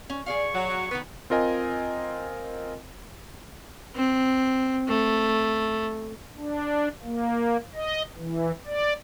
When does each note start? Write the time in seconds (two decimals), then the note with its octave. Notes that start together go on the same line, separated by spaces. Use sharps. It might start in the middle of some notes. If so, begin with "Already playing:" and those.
0.10 C#4
0.26 G#4 D5 F5 C#6
0.55 F#3
0.91 D#3 B3 B4
1.30 C4 F4 A#4 D#5 G#5
3.95 C4
4.88 A3
6.37 D4
7.03 A#3
7.74 D#5
8.17 E3
8.66 D5